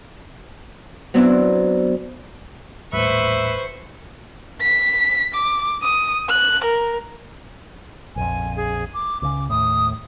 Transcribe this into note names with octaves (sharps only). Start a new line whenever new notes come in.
F#3 B3 C4 D4 E4
D#1 A1 A2 B4 C5 E5 C#6
B6
D6
D#6
F#6
A#4
A#1 F2 G#5
G#4
D6
C#2 C#3 D6
D#2 A2 D#6